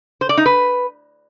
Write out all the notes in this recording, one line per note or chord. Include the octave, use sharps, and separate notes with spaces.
C5
D5
D#4
B4